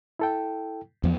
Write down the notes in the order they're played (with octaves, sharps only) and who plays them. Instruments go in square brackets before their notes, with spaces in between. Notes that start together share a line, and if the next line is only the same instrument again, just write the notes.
[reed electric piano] E4 A4 G5
[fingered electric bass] E2 F3 B3